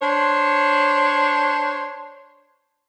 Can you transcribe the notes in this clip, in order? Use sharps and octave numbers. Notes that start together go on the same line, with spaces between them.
D4 C5 C#5